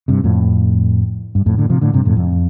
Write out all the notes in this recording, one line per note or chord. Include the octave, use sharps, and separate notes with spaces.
G2 C3
F2 A2
G2
F2 A2
A2 D3
C3 F3
A2 D3
G2 C3
F2 A2
F2